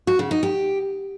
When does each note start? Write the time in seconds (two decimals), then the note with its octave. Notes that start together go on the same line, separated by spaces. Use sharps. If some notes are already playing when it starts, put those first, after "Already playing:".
0.07 F#4
0.19 C#3
0.31 D#4
0.43 G4